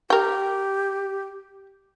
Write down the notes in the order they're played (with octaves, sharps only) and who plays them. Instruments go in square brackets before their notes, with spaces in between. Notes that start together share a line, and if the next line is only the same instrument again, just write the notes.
[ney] G4 [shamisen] A#4 G5